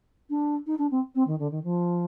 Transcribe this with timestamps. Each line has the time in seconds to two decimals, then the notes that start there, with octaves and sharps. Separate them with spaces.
0.30 D4
0.67 D#4
0.78 D4
0.91 C4
1.15 C4
1.27 D#3
1.39 D3
1.51 D#3
1.64 F3